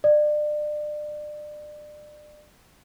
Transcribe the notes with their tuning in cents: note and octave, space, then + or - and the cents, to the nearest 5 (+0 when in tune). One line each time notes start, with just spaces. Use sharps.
D5 +30